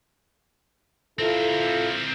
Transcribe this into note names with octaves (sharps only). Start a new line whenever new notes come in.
C4 E4 F4 A4 A#4